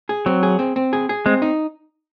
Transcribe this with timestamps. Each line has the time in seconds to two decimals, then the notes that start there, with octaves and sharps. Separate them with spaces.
0.09 G#4
0.26 F#3 C4
0.43 G#4
0.59 C4
0.76 C4
0.93 G#4
1.09 G#4
1.26 G#3 C4
1.42 D#4